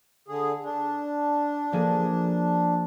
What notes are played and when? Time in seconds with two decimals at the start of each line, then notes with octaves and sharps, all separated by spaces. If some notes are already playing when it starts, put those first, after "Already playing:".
0.28 D3 G#4
0.64 D4
1.72 F3 A#3 G#4